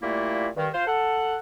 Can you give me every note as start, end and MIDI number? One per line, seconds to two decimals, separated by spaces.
0.01 0.47 46
0.01 0.47 55
0.01 0.47 57
0.01 0.47 58
0.01 0.47 64
0.56 0.67 43
0.56 0.67 51
0.73 0.83 65
0.73 0.83 72
0.87 1.37 69
0.87 1.37 78